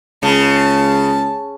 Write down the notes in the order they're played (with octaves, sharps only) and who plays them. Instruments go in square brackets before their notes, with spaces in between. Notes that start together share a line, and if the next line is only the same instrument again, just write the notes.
[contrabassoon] C#2 [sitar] C#3 [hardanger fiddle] A5